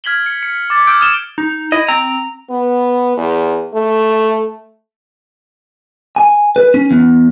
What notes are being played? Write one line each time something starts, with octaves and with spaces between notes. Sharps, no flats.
F6 G#6 B6 F#7 G7
C#7
C#7
D6 A6
D6 E6 F6 G6 D7
D#6 F6 A6 D#7 E7 G7
D#4
E4 D#5
C4 A#5
B3
E2
A3
G#5
B4
C#4
E2